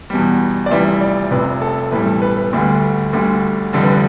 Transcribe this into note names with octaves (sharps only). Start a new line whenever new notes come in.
E2 B2 G3
D5
F1 F2 E3 G3 E5
D5
F1 F2 C3 B4
A4
B1 A2 E3 G3 B4
A4
B4
B4
D2 D3 G3 B4
D2 D3 G3
F1 F2 D3 G3 A4
B4